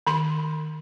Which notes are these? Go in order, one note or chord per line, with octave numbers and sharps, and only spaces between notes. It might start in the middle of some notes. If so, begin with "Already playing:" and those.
D#3 B5 C6